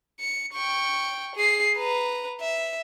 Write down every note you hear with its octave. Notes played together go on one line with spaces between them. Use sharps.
C#7
G5 C#6
G#4 C7
B4 A#5
E5